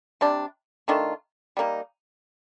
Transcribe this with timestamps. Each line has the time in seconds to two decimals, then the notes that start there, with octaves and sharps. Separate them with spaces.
0.21 C3 G3 D4
0.88 D#3 A3 D4 F4
1.57 G3 A#3 D#4